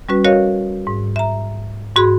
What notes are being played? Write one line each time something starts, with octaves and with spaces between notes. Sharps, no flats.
G3 C#4 F#4 B4
F#4 A#4 C#5 D#5 F5
G#2
E5 A#5
G#2 F#4 G#4 B5 C6